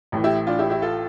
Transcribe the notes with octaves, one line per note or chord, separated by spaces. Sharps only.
A1 A2 E3
E4 G4
D4 F4
E4 G4
E4 G4
F4 A4